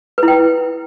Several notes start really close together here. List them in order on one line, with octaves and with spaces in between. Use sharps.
B4 E4 G5